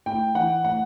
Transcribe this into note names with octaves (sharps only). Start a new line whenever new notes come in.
A2 G5
E3 F#5
A2 F#5